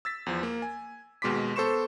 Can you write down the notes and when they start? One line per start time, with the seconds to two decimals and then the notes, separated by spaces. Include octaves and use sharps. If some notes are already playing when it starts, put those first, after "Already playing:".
0.05 E6 A6 B6
0.26 E2 F3
0.43 A#3
0.62 G#5
1.22 D#2 B2 G#3 C6 D6 B6
1.56 B3 A4 C5 C6 C#6 E7